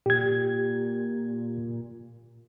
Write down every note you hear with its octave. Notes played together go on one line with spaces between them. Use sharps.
A#2 G4 G#6